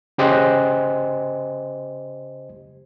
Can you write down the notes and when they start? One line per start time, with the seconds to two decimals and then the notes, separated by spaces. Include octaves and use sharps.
0.18 C#3 G4 C5 D#5 G#5 F#6